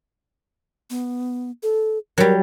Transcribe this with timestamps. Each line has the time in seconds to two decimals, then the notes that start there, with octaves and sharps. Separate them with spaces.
0.90 B3
1.63 A4
2.18 F#3 G3 A#4